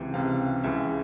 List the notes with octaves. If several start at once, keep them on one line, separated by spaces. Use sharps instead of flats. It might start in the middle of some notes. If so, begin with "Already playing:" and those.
Already playing: C#2 C3 E3 G5
C#2 C3 E3 F5
C#2 C#3 E3 E5